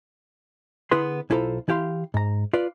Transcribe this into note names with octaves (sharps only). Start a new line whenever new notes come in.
D3 B3 E4 G#4 B4 C6
B1 E4 F4 A4 C5 A#5
E3 E4 G4 F5 C6
G#2 A#5
F4 B4 D5